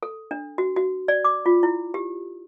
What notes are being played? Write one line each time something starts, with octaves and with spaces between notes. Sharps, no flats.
A4
D4
F#4
F#4
D5
D6
F4
E4
G4